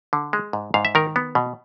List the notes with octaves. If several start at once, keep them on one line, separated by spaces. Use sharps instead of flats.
D3
G#3
G#2
G#2 F5
E5
D#3 A#4
B3
B2